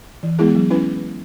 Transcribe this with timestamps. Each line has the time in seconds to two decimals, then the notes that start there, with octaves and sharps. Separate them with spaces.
0.23 E3
0.39 G#3 B3 E4 G#4
0.55 F#3
0.70 C#4 E4 B4